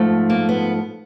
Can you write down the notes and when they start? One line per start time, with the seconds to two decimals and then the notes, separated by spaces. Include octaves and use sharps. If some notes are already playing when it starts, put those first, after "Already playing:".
Already playing: G#2 F3 A3
0.30 A#3
0.49 B3